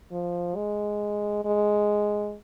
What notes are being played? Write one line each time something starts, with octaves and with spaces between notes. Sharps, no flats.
F3
G#3
G#3